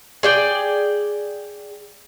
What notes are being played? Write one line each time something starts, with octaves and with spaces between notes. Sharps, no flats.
G#4 D5 G5